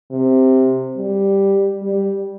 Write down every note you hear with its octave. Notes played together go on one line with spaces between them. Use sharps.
C3
G3
G3